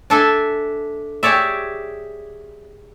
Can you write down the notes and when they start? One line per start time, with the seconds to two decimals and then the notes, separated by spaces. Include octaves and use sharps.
0.10 D4 A4 E5 G#5
1.23 G4 G#4 C#5 D5 E5